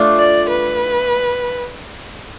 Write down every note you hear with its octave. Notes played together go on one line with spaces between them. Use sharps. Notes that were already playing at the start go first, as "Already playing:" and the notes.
Already playing: A3 D4 F4
D5
B4